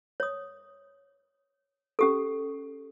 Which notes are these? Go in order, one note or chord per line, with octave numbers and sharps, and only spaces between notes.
C#5 D#6
C#4 G4 A4